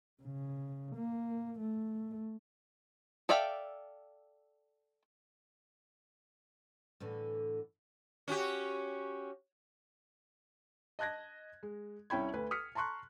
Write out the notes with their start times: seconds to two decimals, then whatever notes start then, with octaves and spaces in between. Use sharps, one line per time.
0.22 C#3
0.96 A#3
1.59 A3
3.29 A4 D5 E5 F5 G5
7.00 A2 D3 E3
8.28 C#4 F#4 G4
10.99 D#5 A5 F#6 G#6 A#6
11.63 G#3
12.10 C2 C#4 E4 G5 B5 G#6
12.33 D2 B4
12.51 D#6 F6 B6 C#7
12.75 A5 A#5 C6 C#6 F#6